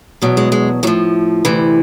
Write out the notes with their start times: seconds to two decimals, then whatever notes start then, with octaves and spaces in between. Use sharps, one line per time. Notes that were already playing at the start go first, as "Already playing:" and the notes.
0.22 E2 B2 F#3
0.37 G#3
0.52 G#3
0.83 A2 F#3
0.87 F3
1.45 D2 C3 E3